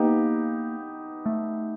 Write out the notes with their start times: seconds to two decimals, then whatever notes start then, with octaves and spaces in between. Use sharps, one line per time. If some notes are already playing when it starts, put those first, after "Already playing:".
Already playing: A#3 B3 D#4 G4
1.26 A3